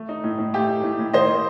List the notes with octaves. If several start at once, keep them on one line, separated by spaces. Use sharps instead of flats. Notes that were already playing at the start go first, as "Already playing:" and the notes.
Already playing: A3
D#4
A2
A2
A3 G4
D#4
A2
A2
D#3 C5 D#5
A#3